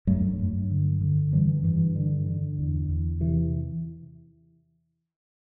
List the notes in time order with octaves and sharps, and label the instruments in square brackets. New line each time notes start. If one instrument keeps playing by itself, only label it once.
[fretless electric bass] G2 F#3 A3
G2
D3
D3
G2 E3 G3
G2 E3
D3
D3
E2
E2
C3 E3